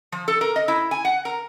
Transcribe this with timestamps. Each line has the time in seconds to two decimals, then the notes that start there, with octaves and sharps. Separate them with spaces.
0.12 F3
0.28 A4
0.41 A#4
0.56 D#5
0.68 E4
0.91 G#5
1.05 F#5
1.25 A#4